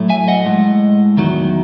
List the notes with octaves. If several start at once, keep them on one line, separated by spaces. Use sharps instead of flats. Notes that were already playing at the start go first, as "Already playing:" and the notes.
Already playing: A2 F#3 A3
E5 G#5
D#5 F#5
A2 G#3
E2 D#3 F#3